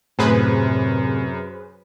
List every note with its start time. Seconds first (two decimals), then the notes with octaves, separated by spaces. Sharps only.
0.19 F#2 A2 C3 G#4 B4 C5